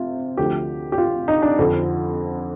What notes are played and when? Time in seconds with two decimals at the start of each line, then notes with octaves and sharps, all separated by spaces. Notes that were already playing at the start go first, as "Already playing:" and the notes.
Already playing: C3 F4
0.37 D2 D3 F3 G4
0.92 G4
0.98 F4
1.28 D#4
1.42 D4
1.58 F2 D3 F3